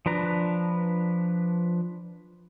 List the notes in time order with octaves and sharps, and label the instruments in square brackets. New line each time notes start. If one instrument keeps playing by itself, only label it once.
[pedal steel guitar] F3 D4 B4 A#5